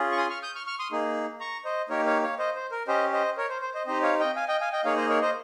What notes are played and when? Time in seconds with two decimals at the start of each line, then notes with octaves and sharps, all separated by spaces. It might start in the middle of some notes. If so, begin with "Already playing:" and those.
Already playing: C#4 F4 G#4
0.12 C#6
0.18 C6 D#6
0.30 C#6 F6
0.42 D#6 G6
0.55 C#6 F6
0.66 C#6 F6
0.79 C6 D#6
0.92 A#3 D#4 G#4
1.40 A#5 C#6
1.65 C5 D#5
1.89 A#3 D#4 G4 A#4 C#5
2.06 C#5 F5
2.22 C#5 F5
2.39 C5 D#5
2.55 C5
2.71 A#4
2.87 C#4 G4 C5 D#5
3.12 C5 D#5
3.37 A#4 C#5
3.49 C5
3.62 C5
3.74 C5 D#5
3.86 C4 D#4 G4 C5 D#5
4.02 C#5 F5
4.19 D#5 G5
4.36 F5 G#5
4.48 D#5 G5
4.60 F5 G#5
4.72 D#5 G5
4.84 A#3 D#4 G#4 C#5 F5
4.97 C5 D#5
5.09 A#4 C#5
5.21 C5 D#5